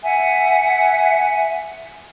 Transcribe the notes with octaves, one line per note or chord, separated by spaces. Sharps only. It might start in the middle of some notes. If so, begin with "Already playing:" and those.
E5 F#5 G#5